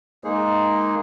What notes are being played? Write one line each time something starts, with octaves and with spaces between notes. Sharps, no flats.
G#3 A#3 D#4 G#4